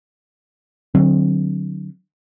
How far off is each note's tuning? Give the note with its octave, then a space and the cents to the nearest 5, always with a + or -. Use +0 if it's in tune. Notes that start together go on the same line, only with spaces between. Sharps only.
D3 +25 F#3 +0 C4 +30